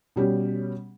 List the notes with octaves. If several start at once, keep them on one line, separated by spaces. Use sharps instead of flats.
B2 G3 C#4 G4